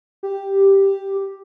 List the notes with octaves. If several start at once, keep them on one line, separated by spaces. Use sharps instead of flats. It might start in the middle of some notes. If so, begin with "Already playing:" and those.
G4